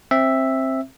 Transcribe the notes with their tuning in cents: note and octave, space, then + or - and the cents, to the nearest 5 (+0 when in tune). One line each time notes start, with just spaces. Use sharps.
C4 +20 E5 +0